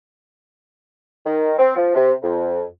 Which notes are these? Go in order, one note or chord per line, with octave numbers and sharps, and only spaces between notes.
D#3
C4
F3
C3
F2